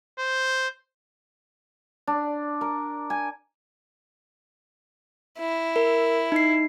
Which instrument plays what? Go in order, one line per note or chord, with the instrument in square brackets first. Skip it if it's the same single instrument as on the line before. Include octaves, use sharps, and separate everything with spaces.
[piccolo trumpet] C5
[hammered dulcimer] D4
A#4
G#5
[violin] E4
[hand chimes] A#4
D#4 C7